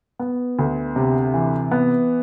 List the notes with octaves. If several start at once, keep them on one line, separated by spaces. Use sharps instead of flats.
B3
D2
C3
E3
B3